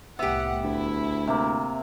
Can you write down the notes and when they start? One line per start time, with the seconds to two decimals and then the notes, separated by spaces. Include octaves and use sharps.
0.19 C2 A2 B3 G4 E5 F#5
0.63 D2 E4
1.28 C3 A#3